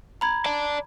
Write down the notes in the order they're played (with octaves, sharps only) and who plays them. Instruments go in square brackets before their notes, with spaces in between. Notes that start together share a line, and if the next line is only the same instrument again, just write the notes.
[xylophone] A#5 B5 G#6
[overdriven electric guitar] D5 A5